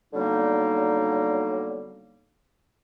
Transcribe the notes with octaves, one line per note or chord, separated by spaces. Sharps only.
D3 F#3 G3 A#3 B3 D#4